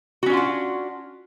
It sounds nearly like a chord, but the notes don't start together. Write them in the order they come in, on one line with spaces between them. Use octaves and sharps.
F#4 C#4 D4 F4 F#5